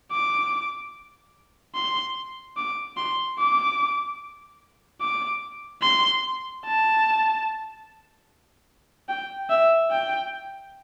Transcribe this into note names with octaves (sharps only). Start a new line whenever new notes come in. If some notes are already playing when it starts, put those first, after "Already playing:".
D6
C6
D6
C6
D6
D6
C6
A5
G5
E5
G5